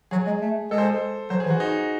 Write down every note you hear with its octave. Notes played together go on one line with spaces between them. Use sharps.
F#3 G#4
G#3
A3
G#3 A4
C5
A4
F#3 C5
G#4
E3
F#4
D#4